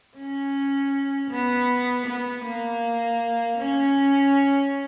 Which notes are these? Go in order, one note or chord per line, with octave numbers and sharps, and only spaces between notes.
C#4
B3
B3
A#3
C#4